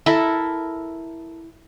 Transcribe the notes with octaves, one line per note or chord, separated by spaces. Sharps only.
E4 A4 A#4